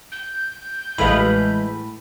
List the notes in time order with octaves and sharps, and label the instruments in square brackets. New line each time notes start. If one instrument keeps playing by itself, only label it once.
[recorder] G6
[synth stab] A1 B5 [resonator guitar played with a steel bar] A2 B4 F5 [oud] E3 G#3 D#5